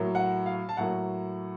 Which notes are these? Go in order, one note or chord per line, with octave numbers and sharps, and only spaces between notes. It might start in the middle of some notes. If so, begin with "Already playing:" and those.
Already playing: A2 F#3 A#3
F#5
F5
A5
A2 F#3 A#3 F#5